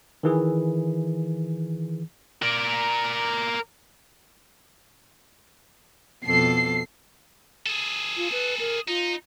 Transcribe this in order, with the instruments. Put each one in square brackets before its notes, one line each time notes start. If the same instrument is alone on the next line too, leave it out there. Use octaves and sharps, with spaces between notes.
[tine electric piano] D#3 E3 G#4
[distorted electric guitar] A#4 D5
[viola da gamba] F2 B2 A4 [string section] C7
[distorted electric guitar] G#4 A4
[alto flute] F4
B4
A#4
[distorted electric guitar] D#4 [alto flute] F4